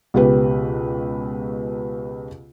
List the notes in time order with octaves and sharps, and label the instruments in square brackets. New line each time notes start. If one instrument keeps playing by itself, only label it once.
[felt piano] C#2 B2 G4 B4